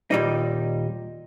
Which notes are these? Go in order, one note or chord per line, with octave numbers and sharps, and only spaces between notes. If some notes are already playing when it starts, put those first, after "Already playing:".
D#2 A#2 G3 D#4